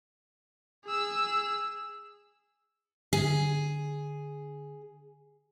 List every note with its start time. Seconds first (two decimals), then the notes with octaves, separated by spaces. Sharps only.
0.85 G#4 E6
3.13 D3 G#4